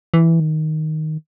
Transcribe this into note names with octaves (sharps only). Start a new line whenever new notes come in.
E3
D#3